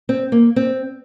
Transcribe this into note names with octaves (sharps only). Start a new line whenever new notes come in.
C4
A#3
C4